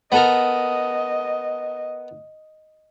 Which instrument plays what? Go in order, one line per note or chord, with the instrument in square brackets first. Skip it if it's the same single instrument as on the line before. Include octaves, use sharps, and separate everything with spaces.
[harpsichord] B3 A4 A#4 [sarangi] D#5